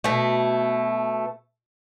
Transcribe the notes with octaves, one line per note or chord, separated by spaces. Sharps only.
B2 A3